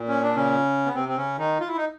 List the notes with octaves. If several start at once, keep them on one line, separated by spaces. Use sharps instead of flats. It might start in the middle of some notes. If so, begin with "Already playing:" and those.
Already playing: A#2
C#4
D4
C#3 C#4
B3
C3 C4
C4
C#3 C#4
D#3 D#4
F4
E4
D#4